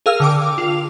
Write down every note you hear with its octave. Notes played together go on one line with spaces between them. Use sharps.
G#4 A#4 F5 E6 F6
D3 G5 D6
F4 F7